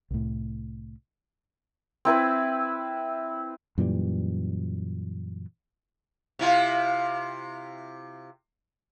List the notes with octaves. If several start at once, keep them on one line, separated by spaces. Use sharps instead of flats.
C2 A2
C4 E4 B4 C5
F#2 A#2 E3 G3
C3 E4 F4